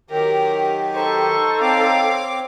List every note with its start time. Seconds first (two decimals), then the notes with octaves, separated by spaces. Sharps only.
0.10 D#3 F#3 G4 A#4
0.95 D#4 A4 C5 C#6
1.61 C4 C#5 F5 D6